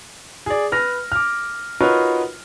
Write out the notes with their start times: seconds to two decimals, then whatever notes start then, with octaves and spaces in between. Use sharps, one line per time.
0.46 G#4 D5
0.72 B4 F6 A#6
1.12 D6 F6
1.80 D#4 F4 F#4 A#4 B4 C#5